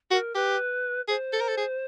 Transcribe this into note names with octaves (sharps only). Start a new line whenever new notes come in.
F#4 A#4
G4 B4
G#4 C5
A4
A#4
A4
G#4